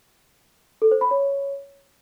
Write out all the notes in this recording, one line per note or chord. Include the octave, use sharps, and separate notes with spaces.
A4
C5
B5
C#5